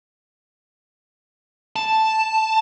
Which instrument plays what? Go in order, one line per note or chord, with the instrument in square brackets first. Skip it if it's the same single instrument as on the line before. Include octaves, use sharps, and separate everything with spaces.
[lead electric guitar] A5